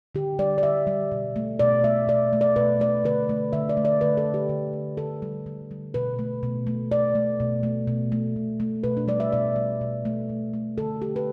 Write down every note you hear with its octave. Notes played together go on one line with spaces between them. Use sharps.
D3 G4
G3 D5
D5
D3 E5
G3
B2
A3
B2 D5
A3 E5
B2 D5
A3
D5
B2 B4
A3 D5
D3 B4
A3
D3 E5
D5
A3
D5
D3 B4
A4
A3
G4
D3
A3
D3 A4
G3
D3
G3
B2 B4
A3
B2
A3
B2 D5
A3
B2
A3
B2
A3
B2
A3
B2 B4
D4
G3 D5
E5
B2 D5
G3
B2
A3
B2
A3
D3 A4
G3 G4
B4